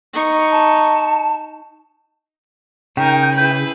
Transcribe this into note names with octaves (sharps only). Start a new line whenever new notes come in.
D#4 C#6
A5
C#3 D#4 A#4 G5
E4 G#4 B4